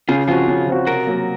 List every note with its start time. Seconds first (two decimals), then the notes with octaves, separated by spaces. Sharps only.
0.09 C#3 F4 G#4
0.28 F3 C4 F4 F#4 G#4
0.48 C#3
0.67 F3 C4 F#4
0.87 C3 F#4 A#4
1.07 F#3 A#3